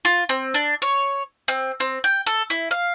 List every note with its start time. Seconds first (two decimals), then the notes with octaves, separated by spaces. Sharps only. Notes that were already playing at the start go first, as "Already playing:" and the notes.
0.05 F4
0.29 C4
0.54 D4
0.82 C#5
1.48 C4
1.80 C4
2.04 G5
2.26 A4
2.50 E4
2.71 F5